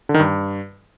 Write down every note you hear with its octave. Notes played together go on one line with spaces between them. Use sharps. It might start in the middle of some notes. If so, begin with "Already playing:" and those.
D3
D#3
G2